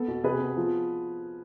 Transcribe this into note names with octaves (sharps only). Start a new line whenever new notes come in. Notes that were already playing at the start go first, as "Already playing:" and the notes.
Already playing: B3 A4
B2
C3 G#4 B4
B3
F3